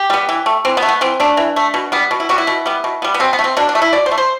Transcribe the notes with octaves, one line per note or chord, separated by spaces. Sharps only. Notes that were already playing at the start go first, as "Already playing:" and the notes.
Already playing: G4
G3 B3
E3
A3
E3 C4
B3
A3
B3
E3 C4
A3 D4
E3
A3
B2
G3 B3
B2
E4
G3 B3 F#4
E4
B2
G3 B3
B2
G3 B3
B3
B2 C4
B3
A3
C4
B2 D4
D4
A3
E4
B2 D5
C5
A3
C5